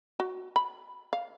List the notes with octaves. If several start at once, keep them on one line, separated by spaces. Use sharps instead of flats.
F#4
B5
F5